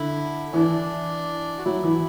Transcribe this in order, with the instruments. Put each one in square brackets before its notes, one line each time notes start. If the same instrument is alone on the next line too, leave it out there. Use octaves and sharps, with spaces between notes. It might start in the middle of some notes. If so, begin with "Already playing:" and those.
Already playing: [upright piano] D3 [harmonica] E4
[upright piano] E3 [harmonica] D4
[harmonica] F#4
[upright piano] F#3 [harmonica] E4
[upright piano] E3